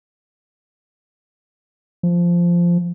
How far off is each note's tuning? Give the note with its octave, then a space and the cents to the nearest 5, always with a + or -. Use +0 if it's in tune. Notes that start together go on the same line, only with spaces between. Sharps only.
F3 -10